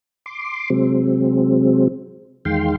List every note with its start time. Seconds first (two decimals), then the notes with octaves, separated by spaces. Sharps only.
0.26 C6 D6
0.70 C3 F#3 G#3 C4
2.45 E2 D#3 G#3 F5 G5 C6